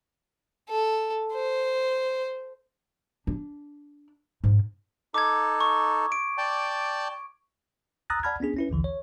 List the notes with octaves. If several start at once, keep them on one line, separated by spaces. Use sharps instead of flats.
A4
C5
D4
G#2
D#4 A4 D6 G#6
C#6
D7
D5 G5 A5
A#5 D#6 E6 F#6 A6 A#6
D5 F#5 A5 B5 F6 G#6
B3 C#4 D4 G#4
C#4 E4 B4
A#1 D#2 D3 E3
C#5